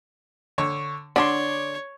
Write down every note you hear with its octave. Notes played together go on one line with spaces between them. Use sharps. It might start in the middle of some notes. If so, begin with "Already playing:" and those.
D3 C#5 C#6
D3 D4 C#5 D5 C6